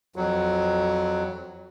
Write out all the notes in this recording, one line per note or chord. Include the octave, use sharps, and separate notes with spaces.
F2 F#3